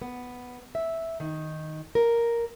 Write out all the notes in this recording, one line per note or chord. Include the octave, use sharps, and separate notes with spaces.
B3
E5
D#3
A#4